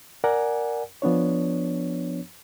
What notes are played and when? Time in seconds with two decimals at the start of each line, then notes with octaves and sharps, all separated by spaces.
0.24 A#4 D5 F#5 G#5
1.02 F3 B3 D4 C#5